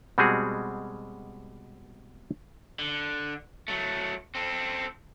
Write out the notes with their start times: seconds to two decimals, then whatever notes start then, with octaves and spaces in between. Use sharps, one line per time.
0.18 B2 G3 G#3 C4 F#4 G#4
2.79 D3
3.68 F#3 A3
4.35 C4 A4